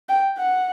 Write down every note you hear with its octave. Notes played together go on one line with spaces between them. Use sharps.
G5
F#5